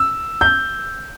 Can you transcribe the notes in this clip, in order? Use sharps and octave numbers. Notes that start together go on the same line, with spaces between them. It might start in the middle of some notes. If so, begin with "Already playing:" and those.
Already playing: E6
G6